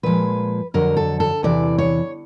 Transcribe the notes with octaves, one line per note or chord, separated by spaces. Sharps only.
A#2 F3 G#3 B4
F2 D3 F#3 A#4
A4
A4
E2 C3 E3 D5
C#5